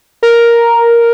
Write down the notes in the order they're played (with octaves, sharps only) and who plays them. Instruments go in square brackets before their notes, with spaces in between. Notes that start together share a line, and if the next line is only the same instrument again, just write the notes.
[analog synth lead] A#4